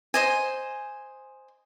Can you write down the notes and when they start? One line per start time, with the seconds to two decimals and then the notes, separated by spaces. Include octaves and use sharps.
0.14 C5 D#5 G#5